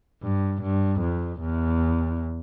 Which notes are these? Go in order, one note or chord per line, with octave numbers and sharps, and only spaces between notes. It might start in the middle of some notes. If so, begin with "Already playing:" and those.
G2
G2
F2
E2